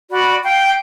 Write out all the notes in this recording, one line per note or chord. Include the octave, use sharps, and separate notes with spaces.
F#4 D5 B5
F5 G5